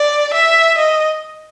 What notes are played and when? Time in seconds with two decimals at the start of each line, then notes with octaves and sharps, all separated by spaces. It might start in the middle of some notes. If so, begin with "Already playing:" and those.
Already playing: D5
0.34 E5
0.78 D#5